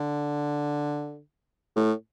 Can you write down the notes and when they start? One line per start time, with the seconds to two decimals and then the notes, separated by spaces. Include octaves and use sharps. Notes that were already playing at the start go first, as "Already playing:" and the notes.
Already playing: D3
1.76 A2